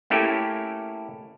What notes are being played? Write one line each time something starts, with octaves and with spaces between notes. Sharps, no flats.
A3 A#3 C#4 E4 G4 A4